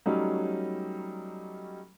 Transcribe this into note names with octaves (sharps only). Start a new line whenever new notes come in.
F#3 G3 A3 C#4 D#4